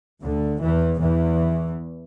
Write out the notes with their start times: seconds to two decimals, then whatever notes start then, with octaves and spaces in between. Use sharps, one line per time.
0.22 D2 D3
0.61 E2 E3
0.99 E2 E3